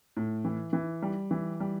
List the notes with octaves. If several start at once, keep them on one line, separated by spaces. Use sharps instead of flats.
A2
E3
E3
G3
E3
G3